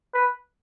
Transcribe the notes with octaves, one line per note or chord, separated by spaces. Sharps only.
B4